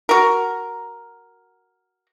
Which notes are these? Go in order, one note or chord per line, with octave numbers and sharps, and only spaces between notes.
F#4 A#4